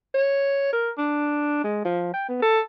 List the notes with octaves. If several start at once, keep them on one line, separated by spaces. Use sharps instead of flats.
C#5
A#4
D4
G#3
F3
G5
B3
A4